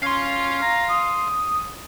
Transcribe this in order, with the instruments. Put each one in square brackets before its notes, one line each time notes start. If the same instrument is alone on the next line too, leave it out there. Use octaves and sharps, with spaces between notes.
[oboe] C#4 [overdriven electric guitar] F5 C6
[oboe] A#5
D#6